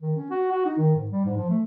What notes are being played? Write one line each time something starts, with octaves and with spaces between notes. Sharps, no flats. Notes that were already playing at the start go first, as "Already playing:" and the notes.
D#3
C#4
F#4
F#4
D#4
D#3
G#2
G3
G#2
F3
A3